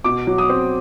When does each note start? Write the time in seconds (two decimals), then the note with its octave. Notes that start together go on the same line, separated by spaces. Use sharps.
0.04 B2 D6
0.27 F#3
0.38 D#6
0.49 C4